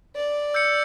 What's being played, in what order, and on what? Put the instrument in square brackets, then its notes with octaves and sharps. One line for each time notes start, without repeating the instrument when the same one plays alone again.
[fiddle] D5
[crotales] E6 G6 C#7